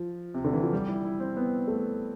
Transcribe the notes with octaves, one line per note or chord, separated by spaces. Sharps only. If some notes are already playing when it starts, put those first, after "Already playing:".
Already playing: F3
C3
D3
E3
F3
G3
E4
E4
C4
B3
A3